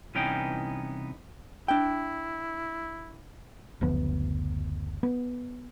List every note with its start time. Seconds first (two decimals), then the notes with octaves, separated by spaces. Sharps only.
0.15 C2 E3 B3 C#4 D#4 G5
1.68 D4 E4 G5
3.81 F#1 D2 F3 B3
5.03 B3